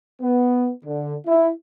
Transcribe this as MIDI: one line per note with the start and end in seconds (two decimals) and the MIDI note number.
0.22 0.70 59
0.84 1.15 50
1.27 1.49 64